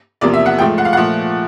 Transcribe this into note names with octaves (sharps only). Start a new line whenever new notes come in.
E2 C3 F3 A#3 D5
E5
F#5
G#2 F3 A3 G5
F#5
F5
A#2 F3 A3 F#5